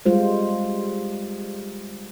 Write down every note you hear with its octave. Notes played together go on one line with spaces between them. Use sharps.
G3 G#3 F4 C5